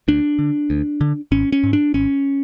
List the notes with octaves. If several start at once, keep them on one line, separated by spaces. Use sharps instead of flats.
D2 D4
D3
D2
D3
G#1 C#4
C#4
G#2
D4
G#1 C#4